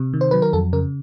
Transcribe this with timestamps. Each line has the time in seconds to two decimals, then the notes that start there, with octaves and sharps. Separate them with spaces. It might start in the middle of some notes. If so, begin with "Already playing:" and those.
Already playing: C3
0.14 D#3
0.21 C5
0.31 F#3 B4
0.42 A#4
0.53 F2 A4
0.73 C#3 A#4